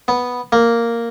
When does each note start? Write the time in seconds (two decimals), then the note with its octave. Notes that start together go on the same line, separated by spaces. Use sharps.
0.08 B3
0.52 A#3